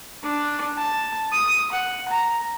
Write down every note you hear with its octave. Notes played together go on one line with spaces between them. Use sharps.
D4
A5
D#6
F#5
A#5